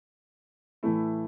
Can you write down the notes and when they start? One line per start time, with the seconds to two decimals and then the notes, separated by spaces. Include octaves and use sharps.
0.83 A2 E3 A3 E4